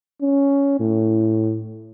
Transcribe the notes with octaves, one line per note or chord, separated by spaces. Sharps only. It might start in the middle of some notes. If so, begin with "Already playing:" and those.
C#4
A2